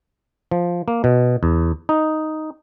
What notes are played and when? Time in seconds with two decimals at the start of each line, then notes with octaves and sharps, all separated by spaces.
0.51 F3
0.88 A#3
1.04 B2
1.43 E2
1.89 D#4